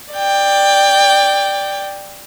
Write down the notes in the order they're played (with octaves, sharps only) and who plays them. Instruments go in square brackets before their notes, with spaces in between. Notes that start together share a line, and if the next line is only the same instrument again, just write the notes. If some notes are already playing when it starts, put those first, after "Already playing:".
[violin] D5 G5